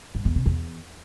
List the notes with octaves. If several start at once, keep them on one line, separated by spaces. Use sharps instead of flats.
G2
E2
C3
E2